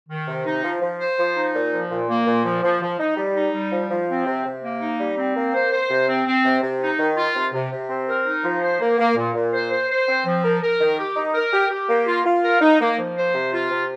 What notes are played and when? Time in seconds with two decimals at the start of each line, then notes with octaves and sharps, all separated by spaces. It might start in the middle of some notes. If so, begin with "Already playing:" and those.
0.09 D#3
0.28 C3
0.46 D#4
0.64 F3
0.81 F3
1.00 C5
1.18 F3
1.36 D#4
1.54 A#2
1.73 F3
1.90 A#2
2.09 A#3
2.27 A#2
2.45 F3
2.63 F3
2.81 F3
2.99 D#4
3.17 G3
3.35 D#4
3.54 G3
3.72 F3
3.90 F3
4.09 C4
4.26 C3
4.45 C3
4.63 A#3
4.81 D#4
4.99 G3
5.17 C4
5.36 A#3
5.54 C5
5.72 C5
5.90 C3
6.08 C4
6.27 C4
6.44 C3
6.63 C3
6.80 D#4
6.99 D#3
7.16 F4
7.35 C3
7.53 C3
7.72 C3
7.89 C4
8.08 A#4
8.26 D#4
8.44 F3
8.62 C5
8.80 A#3
8.99 A#3
9.16 A#2
9.35 A#2
9.53 C5
9.71 C5
9.89 C5
10.07 C4
10.26 F3
10.44 A#4
10.62 A#4
10.80 D#3
10.99 G4
11.16 D#4
11.34 A#4
11.52 G4
11.70 G4
11.88 A#3
12.07 F4
12.25 F4
12.44 A#4
12.61 D#4
12.80 A#3
12.98 F3
13.16 C5
13.34 C3
13.53 F4
13.71 C3